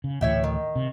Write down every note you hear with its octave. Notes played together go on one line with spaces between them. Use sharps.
C#3
D2 A2 E3 C#5 E5 G5
D#3
C3